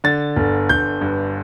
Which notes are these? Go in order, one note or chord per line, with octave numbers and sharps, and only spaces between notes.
D3 A6
G1
G1 G6
G2